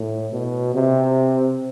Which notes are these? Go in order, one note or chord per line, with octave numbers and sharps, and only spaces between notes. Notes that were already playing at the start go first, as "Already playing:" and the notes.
Already playing: A2
B2
C3